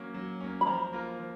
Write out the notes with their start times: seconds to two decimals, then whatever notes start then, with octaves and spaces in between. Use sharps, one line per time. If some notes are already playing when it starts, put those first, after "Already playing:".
Already playing: F#3 A#3 C#4
0.14 F#3
0.40 A#3 C#4
0.61 B5
0.67 F3 A#5
0.93 A#3 F4 A#4
1.19 F3